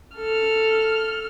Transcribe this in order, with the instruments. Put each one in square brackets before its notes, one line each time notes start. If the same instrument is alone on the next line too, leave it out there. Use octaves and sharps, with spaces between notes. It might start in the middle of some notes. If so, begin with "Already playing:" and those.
[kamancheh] A4 F6